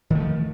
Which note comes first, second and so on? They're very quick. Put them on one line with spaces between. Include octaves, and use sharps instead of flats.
D#3 A3 F3